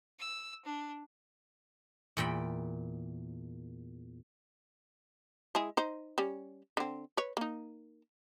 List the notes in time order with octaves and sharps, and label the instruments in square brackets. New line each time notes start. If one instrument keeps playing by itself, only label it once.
[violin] E6
D4
[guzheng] E2 A#2 G5 B5
[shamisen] G#3 E4 G#4
D#4 C5
G3 C#4
D3 C4
B4 C#5
A#3 D#4